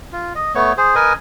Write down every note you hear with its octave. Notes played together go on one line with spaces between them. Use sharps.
F4
D#5
A3 B3 C#5
G#4 C5
A#4 B4 D#5 G#5